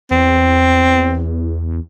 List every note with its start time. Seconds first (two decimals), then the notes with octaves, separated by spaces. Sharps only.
0.11 E2 C4